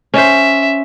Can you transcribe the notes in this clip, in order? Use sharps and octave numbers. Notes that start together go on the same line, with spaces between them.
C#4 C5 E5